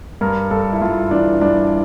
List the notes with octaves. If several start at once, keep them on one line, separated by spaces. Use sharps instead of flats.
G2 A#4
G2 A4
E4
G2 F4
E3 D4
G2 D4